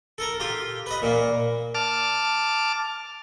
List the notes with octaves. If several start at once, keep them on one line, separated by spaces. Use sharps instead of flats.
A4 A#4
F4 G4
B4 D#5
A#2 A#3
A5 D6 F6